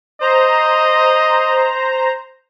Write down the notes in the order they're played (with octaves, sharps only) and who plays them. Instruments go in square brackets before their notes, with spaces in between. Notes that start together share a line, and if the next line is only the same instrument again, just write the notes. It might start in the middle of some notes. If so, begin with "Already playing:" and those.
[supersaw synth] C5 A#5 [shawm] D#5